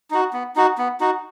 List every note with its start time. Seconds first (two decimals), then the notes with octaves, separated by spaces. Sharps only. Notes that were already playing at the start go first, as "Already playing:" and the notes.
0.11 D#4 F#4
0.33 B3
0.56 D#4 F#4
0.78 B3
1.00 D#4 F#4